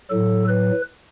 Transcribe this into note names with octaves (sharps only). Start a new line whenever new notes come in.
A2 F#3 A4
B4